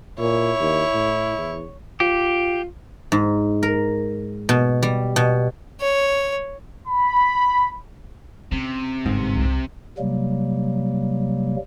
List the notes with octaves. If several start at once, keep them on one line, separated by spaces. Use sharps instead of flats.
A#2 E4 C#5
D#2
A2
E2
F4 G4
G#2
A#4
B2
G3
B2
C#5
B5
C3 C#4
G1 G#2
C2
C3 F#3 G3 A#3